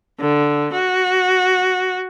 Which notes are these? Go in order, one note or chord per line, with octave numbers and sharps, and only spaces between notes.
D3
F#4